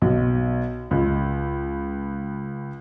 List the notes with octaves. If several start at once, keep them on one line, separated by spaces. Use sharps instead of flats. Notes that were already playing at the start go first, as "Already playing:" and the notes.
B1
C#2